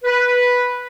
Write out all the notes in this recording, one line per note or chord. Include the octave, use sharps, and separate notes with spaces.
B4